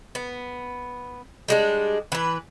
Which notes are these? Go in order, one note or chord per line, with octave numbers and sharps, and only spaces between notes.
B3
G3 G#3 D4
E3 B4